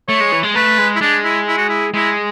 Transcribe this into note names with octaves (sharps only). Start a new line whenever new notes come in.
A3 C#5
G#3
E3
G#3
A3 B4
G#3
E4
G#3 D4
E4
E4
F#4
E4
G#3 E4